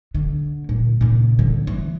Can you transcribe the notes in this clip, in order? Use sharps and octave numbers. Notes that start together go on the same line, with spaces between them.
D3
A#2
A#2 C#3
D3
E3